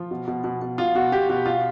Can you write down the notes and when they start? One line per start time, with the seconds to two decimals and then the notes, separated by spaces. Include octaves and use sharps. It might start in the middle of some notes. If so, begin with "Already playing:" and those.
Already playing: F3 F4
0.11 B2
0.27 B2
0.44 B2
0.62 B2
0.78 B2 F4
0.95 B2 F#4
1.12 B2 G4
1.29 B2 F#4
1.46 B2 F4